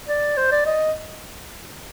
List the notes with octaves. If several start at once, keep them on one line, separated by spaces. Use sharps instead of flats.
D5
C5
D5
D#5